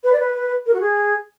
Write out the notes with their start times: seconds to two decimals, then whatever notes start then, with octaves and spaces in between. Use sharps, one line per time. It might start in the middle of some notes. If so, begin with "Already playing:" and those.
0.03 B4
0.12 D5
0.19 B4
0.66 A#4
0.73 F#4
0.80 G#4